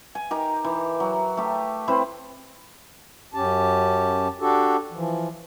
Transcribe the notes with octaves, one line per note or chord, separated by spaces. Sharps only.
G#5
D#4 G4 A#4
E3
F#3
A3 G4
C4 E4 B4 C5
F#2 C#4 G4 A5
D4 F#4 G4 A4
E3 F3